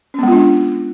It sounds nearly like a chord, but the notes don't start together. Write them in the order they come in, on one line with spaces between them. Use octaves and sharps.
C#4 B3 G#3 F4 D4